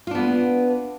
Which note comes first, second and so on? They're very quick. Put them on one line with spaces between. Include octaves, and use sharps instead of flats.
F4 D4 B3